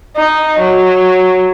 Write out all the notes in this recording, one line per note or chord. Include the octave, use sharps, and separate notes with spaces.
D#4
F#3